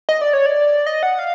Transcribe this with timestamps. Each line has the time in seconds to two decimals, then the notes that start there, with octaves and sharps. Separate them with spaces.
0.09 D#5
0.21 D5
0.33 C#5
0.46 D5
0.86 D#5
1.03 F#5
1.19 F5